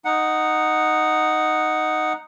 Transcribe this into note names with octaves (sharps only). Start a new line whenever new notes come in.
D#4 F#5